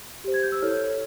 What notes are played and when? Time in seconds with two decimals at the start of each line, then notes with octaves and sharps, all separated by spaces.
0.24 G4 C5
0.34 G#6
0.43 G6
0.52 E6
0.62 E4 A4 C#5 F6